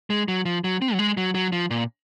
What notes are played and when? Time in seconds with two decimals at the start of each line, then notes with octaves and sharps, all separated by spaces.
0.10 G#3
0.28 F#3
0.45 F3
0.64 F#3
0.82 C4
0.93 F#3
0.99 G#3
1.17 F#3
1.34 F#3
1.52 F3
1.70 A#2